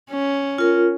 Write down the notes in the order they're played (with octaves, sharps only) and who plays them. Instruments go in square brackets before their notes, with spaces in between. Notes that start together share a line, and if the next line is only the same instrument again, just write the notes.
[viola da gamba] C#4
[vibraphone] F4 A#4